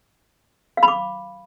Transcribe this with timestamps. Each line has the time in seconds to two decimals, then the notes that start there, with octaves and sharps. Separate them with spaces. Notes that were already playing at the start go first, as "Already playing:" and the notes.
0.77 F5
0.83 B5
0.88 D6